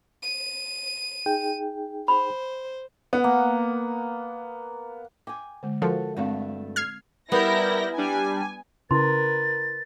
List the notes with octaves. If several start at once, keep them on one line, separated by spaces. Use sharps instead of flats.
D#7
D#4 G#4 G5
C5 B5
B3 F#5
A#3
G5 G#5 D6
D3 G#3
F3 F#4 A4 A#4 C#5 F#5
G2 G#3 A3 C4 F#4 F5
F6 G#6 C7
G3 B3 E4 A#4 G6 A#6
G3 D4 G#5
C#3 E4 A#4 B4 C6 A6